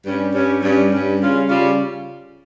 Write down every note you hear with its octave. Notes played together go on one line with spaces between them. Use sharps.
G2 G3 C#4
G2 G3 C#4
G2 G3 C#4
G2 G3 C#4
C#3 G3 C#4 F4
C#3 G3 C#4 F4